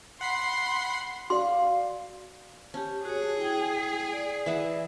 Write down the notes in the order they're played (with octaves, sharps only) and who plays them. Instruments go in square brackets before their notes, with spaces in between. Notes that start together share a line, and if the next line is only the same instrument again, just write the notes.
[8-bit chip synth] F#5 B5 C7 [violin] C6
[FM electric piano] F#4 D5 [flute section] F5 [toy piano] C6
[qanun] C#4 [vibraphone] G4 A5
[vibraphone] F#4 C#5 [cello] G#4
[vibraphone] E4 G5
D5
[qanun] E3 E5 F#5